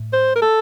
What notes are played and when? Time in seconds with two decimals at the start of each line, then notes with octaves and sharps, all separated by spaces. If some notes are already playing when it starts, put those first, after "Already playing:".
Already playing: A2
0.13 C5
0.36 A#4
0.42 A4